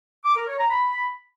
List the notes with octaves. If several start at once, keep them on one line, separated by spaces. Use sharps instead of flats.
D6
A#4
C#5
A#5
B5